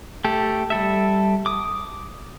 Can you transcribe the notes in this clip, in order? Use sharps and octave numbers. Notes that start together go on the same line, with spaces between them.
A3 G4 A4
G3 A4 E5
D6 D#6